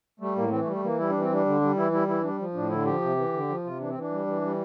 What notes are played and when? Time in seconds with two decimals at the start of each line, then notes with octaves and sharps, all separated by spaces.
0.20 G3 A3
0.36 A2 A#3
0.51 E3 C4
0.61 A3
0.66 G3
0.72 A3
0.82 E3 A#3
0.98 G3 E4
1.10 E3 D4
1.21 C4
1.29 G3 D4
1.46 D3
1.61 G3
1.76 E3 E4
1.91 G3 E4
2.07 E3 E4
2.23 G3 D4
2.39 F3
2.54 A2 D4
2.70 D3 E4
2.85 F3 G4
3.01 C3
3.17 E3
3.33 D3
3.49 F3
3.64 C3 F4
3.79 E3 D4
3.89 C4
3.95 E3 D4
4.11 G3
4.27 E3
4.41 G3